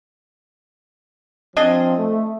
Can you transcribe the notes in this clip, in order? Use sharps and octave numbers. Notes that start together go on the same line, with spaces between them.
F3 C4 D4 G#4 D#5
A3